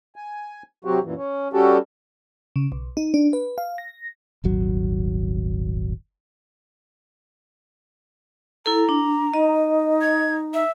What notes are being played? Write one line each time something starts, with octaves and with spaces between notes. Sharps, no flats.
G#5
C3 F#3 C4 F#4 G4
F#2 A#2 E3
C#4
G3 C#4 F#4 G4 A4
C#3
B1
D#4
D4
B4
F5
A#6
D#1 G#1 F#3
E4 A4 A#5
D4
D#4 D#5
G#6
E5